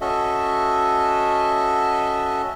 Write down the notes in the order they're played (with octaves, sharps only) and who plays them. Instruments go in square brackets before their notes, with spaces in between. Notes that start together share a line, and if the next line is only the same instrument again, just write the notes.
[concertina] C#4 F#4 A4 D#5 E5